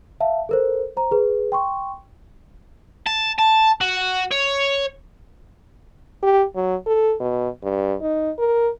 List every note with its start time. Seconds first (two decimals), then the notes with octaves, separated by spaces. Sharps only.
0.21 E5 F5 A5
0.49 A4 A#4 C5
0.97 C5 A#5
1.11 G#4 B4
1.52 G5 C6 C#6
3.07 A5
3.39 A5
3.81 F#4
4.31 C#5
6.23 G4
6.55 F#3
6.86 A4
7.20 B2
7.63 G2
8.02 D#4
8.38 A#4